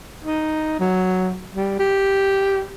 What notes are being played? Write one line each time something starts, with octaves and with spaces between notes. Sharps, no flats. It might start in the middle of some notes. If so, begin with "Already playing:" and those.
D#4
F#3
G3
G4